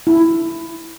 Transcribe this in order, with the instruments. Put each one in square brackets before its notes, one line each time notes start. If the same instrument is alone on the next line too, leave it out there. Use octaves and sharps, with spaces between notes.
[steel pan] E4